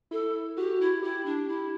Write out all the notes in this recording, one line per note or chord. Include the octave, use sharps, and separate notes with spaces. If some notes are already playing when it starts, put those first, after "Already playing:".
E4 A4
F#4 G4
E4
E4 G4
D4
E4